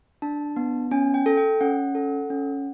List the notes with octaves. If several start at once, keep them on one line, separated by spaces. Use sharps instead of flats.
D4 A5
B3
C#4 G#5
G5
A4
G5
C#4 F#5
A4
C#4